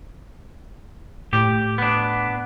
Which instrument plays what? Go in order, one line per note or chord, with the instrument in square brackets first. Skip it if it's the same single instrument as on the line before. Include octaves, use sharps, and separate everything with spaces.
[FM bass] A2 [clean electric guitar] G4
[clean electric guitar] B3 D4